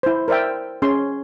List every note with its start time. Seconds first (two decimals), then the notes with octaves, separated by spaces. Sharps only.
0.03 E4 C5
0.28 A#4 C5 D5 E5 G5
0.82 C#4 G#4 C6